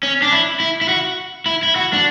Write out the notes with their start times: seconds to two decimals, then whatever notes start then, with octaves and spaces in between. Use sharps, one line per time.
0.03 C#4
0.22 D4
0.32 E4
0.60 E4
0.81 E4
0.89 F#4
1.46 E4
1.63 E4
1.76 F#4
1.93 D4